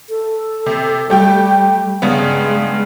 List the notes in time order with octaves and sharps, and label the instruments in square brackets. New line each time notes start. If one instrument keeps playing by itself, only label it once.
[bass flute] A4
[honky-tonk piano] C3
[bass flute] G3 [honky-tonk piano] A3 G4 G5
[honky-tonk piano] G2 C#3 B3 [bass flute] G#3